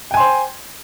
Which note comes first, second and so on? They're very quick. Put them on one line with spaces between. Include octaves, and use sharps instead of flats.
G5 G#5 C6 C5